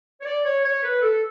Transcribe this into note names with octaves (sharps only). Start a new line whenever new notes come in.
C#5
D5
C#5
C#5
B4
A4